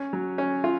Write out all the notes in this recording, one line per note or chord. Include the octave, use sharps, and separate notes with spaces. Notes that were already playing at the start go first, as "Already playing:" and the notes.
Already playing: C#4
F#3
C#4
F4